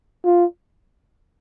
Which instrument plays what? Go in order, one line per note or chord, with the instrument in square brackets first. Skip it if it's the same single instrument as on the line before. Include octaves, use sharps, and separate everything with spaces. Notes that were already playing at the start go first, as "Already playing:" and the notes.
[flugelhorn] F4